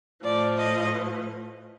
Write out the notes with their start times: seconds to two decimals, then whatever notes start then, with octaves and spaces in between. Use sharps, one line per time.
0.23 A2 F3 D5
0.58 D#5